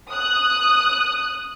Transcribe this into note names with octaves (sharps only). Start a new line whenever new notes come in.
D#6 F#6